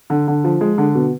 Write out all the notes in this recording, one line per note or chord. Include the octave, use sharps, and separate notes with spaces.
D3
D3
F3
G#3
D3
B2